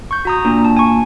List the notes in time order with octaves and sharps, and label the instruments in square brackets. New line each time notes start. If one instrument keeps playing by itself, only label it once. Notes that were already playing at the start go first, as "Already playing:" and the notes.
[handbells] C#6 G6
F#4 A#5 D#6
[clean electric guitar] A#2 [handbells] D4
[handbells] A5
G#5 C#6